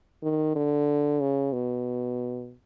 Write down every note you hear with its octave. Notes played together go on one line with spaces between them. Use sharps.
D#3
D3
C#3
B2